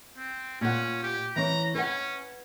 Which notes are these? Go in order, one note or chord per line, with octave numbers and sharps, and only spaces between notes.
C4
A#2 C#4 F#5
G4
E3 C#4 A#5
C#4 B4 F#5